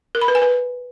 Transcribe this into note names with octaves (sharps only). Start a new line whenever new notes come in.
A#4
B5
B4
G#5
B4